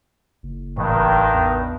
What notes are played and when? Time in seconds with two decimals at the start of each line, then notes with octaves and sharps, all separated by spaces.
0.43 F#1
0.77 A1 G2 D#3
1.33 E2